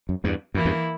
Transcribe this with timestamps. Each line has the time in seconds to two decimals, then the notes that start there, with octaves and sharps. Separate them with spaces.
0.09 F#2
0.24 E2 G2
0.54 F#2 E3 A#3 E4
0.65 E2 G2